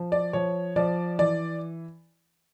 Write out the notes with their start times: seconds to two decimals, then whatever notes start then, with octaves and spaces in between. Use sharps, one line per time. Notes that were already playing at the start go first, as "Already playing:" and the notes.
Already playing: F3
0.12 D5
0.33 F3 C#5
0.76 F3 D5
1.19 E3 D5